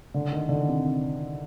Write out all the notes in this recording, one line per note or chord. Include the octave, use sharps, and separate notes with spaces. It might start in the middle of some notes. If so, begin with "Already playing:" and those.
D3
D#3
D3
C3